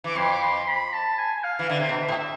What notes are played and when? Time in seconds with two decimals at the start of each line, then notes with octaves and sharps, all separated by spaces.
0.04 E3 D6
0.15 F2 C6
0.32 D6
0.42 C6
0.67 B5
0.93 A5
1.18 G#5
1.37 G#5
1.44 F5
1.59 E3
1.69 D3 E5
1.79 C3
1.89 B2
2.08 A2